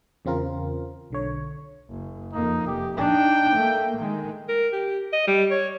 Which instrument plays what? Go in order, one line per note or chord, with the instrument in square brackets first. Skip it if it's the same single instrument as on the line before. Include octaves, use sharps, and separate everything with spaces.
[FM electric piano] E2 C#3 C4 F4 A#4
B1 D3 C#5
[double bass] F#1
[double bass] F2 A#3 [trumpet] D#4
[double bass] F1 [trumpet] G4
[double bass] D4 D#4 [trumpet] G5
[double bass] A3 A#3
D#3 G#3
[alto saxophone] A#4
G4
D#5
G3
C#5